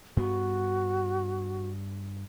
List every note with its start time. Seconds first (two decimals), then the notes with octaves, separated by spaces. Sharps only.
0.17 G2 B3 F#4